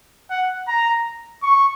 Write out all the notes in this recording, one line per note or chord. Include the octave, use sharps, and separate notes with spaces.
F#5
A#5
C#6